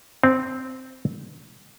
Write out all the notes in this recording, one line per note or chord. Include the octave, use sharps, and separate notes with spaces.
C4